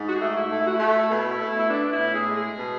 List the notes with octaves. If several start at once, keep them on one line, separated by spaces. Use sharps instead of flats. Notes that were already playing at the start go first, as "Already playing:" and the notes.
Already playing: G#2
F#4
G#4
A3
E4
A3
E4
F#4
E4
A3
B2
A3
E4
B3 D4
E4
A2
G#4
G#3
G#4
B2